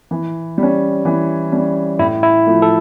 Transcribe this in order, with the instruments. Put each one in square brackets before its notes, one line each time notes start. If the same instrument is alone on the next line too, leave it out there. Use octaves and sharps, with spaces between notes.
[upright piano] E3
G3 C#4
E3
G3 C#4
[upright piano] A2 [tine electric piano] E4
[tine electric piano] E4
[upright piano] F3 A3
[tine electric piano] A4